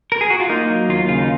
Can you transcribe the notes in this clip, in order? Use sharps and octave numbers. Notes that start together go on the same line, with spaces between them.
A#4
G#4
F#4
F4
A#3 D#4
F#3
D#2 F4
C#3 F4
D#4